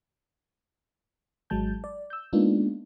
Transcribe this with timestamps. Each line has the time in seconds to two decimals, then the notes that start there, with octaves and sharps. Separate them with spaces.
1.50 G#1 F#3 G#3 A5 G6
1.84 D5
2.10 E6 G6
2.33 G#3 A#3 B3 D4 D#4 F4